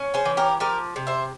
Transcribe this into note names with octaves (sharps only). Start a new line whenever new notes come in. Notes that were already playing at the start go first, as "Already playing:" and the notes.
Already playing: C#4
G#4 C5
E3
G4 A#4
F3 G4 A#4
C3
C5 E5